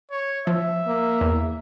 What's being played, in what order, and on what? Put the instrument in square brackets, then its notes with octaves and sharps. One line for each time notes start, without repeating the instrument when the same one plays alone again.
[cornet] C#5
[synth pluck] F3 [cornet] E5
[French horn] A#3
[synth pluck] E2